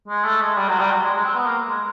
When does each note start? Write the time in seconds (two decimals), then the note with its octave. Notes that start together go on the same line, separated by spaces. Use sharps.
0.08 G#3
0.25 A3
0.42 G#3
0.58 G3
0.69 F#3
0.80 G3
0.91 F#3
1.02 G#3
1.14 G#3
1.25 C4
1.35 B3
1.46 A#3
1.69 G#3